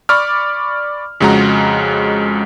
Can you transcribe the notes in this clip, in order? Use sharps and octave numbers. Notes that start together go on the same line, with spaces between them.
D5 B5 C#6 D6 F6
F2 C#3 G#3 F#4 A#5